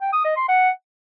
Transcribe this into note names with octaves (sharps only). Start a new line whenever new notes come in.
G5
D#6
D#5
C6
F#5